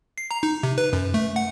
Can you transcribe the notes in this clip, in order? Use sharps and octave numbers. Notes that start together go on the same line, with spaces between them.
C7
A#5
D#4
C3
B4
F#2
A3
F#5